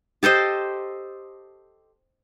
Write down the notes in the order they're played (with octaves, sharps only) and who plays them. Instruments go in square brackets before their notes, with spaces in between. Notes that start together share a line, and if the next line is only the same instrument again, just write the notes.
[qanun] G4 A4 C5 D#5